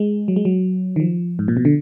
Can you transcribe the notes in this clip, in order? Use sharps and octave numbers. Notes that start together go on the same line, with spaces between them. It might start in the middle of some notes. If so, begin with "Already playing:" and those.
Already playing: G#3
F#3
G#3
F#3
D#3
F3
G#2
A#2
B2
D3